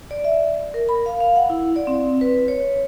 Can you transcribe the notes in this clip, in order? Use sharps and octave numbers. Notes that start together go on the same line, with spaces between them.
D5
E5
A#4
B5
F5
F5
F#5
E4
D5
C4
B4
C#5